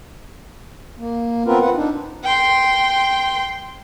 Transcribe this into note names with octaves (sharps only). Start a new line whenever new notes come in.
A#3
B3 C4 F4 A#4 B4
C4 F4 B4 F#5
D4 D#4
G5 C6